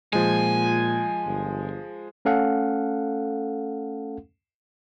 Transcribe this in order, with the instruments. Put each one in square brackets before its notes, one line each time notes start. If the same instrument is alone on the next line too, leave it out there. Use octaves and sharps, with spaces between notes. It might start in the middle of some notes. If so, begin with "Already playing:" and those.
[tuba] A#2 [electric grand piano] F3 G#3 [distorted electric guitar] G#5
[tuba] G1
[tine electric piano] A3 C#4 A4 F5 F#5